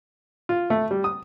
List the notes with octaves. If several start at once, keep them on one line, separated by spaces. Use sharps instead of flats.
F4
A3
G3
D#6